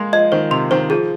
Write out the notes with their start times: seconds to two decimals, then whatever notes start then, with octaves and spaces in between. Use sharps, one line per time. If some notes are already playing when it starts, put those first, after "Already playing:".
Already playing: G#3 A#3 C6
0.13 F3 D#5
0.32 D#3 C5
0.51 C3 C6
0.71 D#3 C5
0.90 F3 G#4